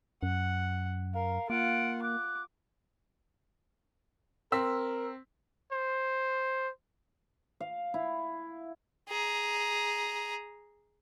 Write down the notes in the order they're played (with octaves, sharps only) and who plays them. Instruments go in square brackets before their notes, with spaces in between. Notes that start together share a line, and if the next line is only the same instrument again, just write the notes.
[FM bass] F#2 [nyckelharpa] F#5
[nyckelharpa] A#4 [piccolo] F5
[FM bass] A#3 [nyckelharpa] F4 F#5 [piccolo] D7
[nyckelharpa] D6 [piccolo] F#6
[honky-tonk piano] C4 E6 B6 [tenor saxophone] A#4
[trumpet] C5
[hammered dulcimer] F5
E4
[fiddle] G#4 A#5